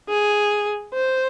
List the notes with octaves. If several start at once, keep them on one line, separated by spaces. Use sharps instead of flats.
G#4
C5